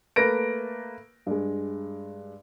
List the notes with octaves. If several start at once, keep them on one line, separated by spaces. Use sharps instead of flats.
A3 A#3 B4 A#6 D7
G2 G#3